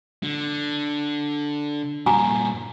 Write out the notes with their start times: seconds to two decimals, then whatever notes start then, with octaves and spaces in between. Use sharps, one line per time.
0.23 D3
2.06 G2 A#2 G#5 A#5